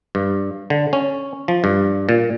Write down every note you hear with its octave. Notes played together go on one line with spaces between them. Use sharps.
G2
D3
C#4
F3
G2
A#2